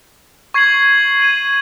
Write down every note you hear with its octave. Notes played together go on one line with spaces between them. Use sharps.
C#6 G#6 C7 F#7
G#6 C7 D#7 F#7